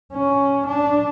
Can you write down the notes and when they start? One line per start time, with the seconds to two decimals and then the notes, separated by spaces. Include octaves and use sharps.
0.12 C#4
0.67 D4